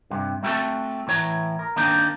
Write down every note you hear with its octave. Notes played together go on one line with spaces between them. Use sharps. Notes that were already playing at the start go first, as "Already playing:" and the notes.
G2 C3
A3 C4 E4 F#4 A4 A5
A2 E3 C#5 A#5
A#4
D#3 A#3 C4 D4 D#4